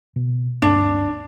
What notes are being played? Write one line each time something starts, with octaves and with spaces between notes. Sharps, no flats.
B2
D1 G2 C4 D4